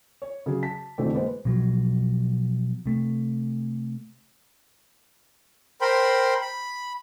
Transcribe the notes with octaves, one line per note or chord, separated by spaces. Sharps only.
C#5
C#3 F#3 G#4
A5 B6
F1 B2 D3 E3 A3 C4
G#3 A#3 B4 C5
B2 F3 F#3
C3 A3
A#4 C5 G5 B5 C6
B5